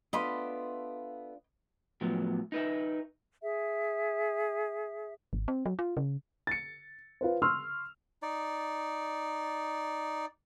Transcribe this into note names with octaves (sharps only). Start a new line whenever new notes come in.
A3 B3 D4 F4 D#5 B5
A2 F3 F#3 B3
D#4 B4 E5
G#4 E5
G#1
C4
F#3
F4
C#3
A6 C#7
F4 B4 C5
C6 C#6 E6 F6
D#4 D5